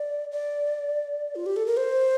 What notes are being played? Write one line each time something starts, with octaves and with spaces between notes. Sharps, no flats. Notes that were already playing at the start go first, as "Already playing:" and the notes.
Already playing: D5
D5
F4
G4
A4
A#4
C5